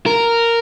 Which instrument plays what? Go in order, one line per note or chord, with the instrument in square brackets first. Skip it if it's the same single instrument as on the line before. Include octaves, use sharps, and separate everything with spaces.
[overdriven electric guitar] A#4